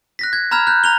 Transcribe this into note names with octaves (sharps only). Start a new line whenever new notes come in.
F#6 A#6 B6
G#6
A#5 B5 F6 G#6
F#6 G6
A#5 F7 G7